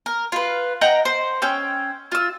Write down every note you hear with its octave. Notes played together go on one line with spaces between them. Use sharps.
A#4
F4 B4
D#5 F#5 G5 A#5
C5
C#4 G5 E6
F4 E6